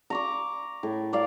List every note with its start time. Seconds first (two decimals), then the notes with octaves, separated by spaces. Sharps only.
0.10 A#5 C#6 D6
0.83 A2
1.13 A#4 D5 F5